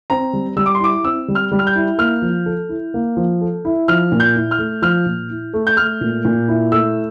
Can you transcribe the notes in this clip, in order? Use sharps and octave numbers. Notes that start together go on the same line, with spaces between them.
C4 A#5
G3
G3 E6
D6
C6
E4 D6
C4 E6
G3
F6
G3
F6
G6
E4
A#3 F6
F3
A4
E4
A#3
F3
A4
E4
F3 F6
A#2
G6
E4
F6
A3
F3 F6
A#2
E4
A3
G6
A3 F6
A#2
A#2
E4
A3 E6